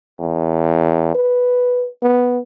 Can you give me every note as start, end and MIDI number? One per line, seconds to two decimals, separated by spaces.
0.20 1.11 40
1.15 1.87 71
2.03 2.39 59